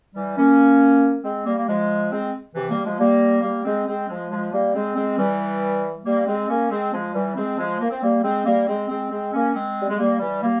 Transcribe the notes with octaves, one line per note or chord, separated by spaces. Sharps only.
E3 G3
A#3 C#4
G#3 C4
G3 A#3
A#3
F3 G#3
G#3 C4
C3 E3
G3 A#3
F3 G#3
G3 A#3
G3 A#3
G#3 C4
G#3 C4
F3 G#3
F3 G#3
G3 A#3
G#3 C4
G#3 C4
E3 G3
G3 A#3
G#3 C4
A#3 C#4
G#3 C4
F3 G#3
E3 G3
G#3 C4
F3 G#3
A#3
C4
G3 A#3
G#3 C4
G3 A#3
G#3 C4
G#3 C4
G#3 C4
A#3 C#4
G#3 C4
G3
G#3
G3 A#3
E3 G3
G3 A#3